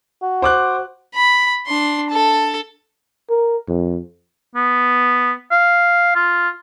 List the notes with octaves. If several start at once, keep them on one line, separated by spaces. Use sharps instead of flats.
F#4
C5 D6 F#6
B5
D4 C6
A4 A5
A#4
F2
B3
F5
F4